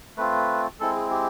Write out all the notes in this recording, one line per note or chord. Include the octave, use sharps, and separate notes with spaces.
A3 C4 F4 B4
G#3 C4 E4 A4
G#4
G4